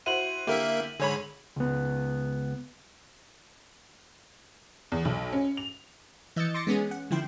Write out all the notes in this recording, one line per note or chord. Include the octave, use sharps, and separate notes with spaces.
E4 F#4 C5 D#7 F#7
D3 A#3 E4 G4 A#4 E5
G#2 D3 G#4 C#5 B5
C#2 B3
E2
B1
C#4
F7
E3 D#5 E6 G6 A6 C#7
C6 D6 A6 A#6 C#7
G#3 B3 C#4 G#4
F#5
D3 F3 E4 G5 C6